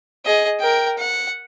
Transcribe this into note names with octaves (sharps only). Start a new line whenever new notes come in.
G#4 D#5
A#4 G5
F#5